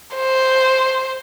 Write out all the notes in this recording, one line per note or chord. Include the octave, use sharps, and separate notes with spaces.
C5